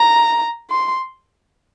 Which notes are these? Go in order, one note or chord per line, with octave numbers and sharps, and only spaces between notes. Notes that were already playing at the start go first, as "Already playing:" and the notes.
Already playing: A#5
C6